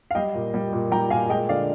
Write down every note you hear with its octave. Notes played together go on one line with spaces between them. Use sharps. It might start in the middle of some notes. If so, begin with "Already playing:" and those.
F5
G3 D#5 G5
A#2
G3
A#2
G3 G5 A#5
A#2 F5 G#5
G#3 D#5 G5
D3 D5 F5